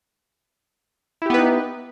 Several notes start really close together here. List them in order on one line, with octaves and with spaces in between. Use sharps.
E4 G4 B3 B4 D#4